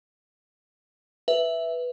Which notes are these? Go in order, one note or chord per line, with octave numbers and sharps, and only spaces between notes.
B4 E5